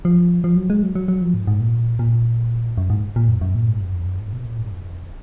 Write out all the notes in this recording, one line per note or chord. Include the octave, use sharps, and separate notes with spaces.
F3
F3
F#3
G#3
F#3
F#3
F#3
F3
G#2
G#2
A#2
A#2
F#2
G#2
A#2
F#2
F#2
A#2
G#2
F#2
F2
F#2
G#2
B2
A#2
G#2
F2